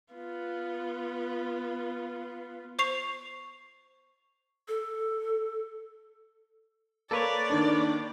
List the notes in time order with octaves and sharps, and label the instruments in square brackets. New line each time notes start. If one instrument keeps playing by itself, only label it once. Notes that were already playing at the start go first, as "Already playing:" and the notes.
[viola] B3 F4
[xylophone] C5 C#6 C7 F7
[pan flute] A4
[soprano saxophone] A#3 [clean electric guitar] A4 B4 C#5 [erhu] D5
[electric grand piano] D#3 A#3 D#4 [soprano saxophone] D4